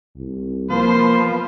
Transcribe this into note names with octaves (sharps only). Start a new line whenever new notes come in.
C2
F3 A#3 B3 C5